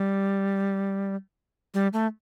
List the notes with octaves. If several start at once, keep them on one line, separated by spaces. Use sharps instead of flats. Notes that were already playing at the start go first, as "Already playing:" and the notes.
Already playing: G3
G3
A3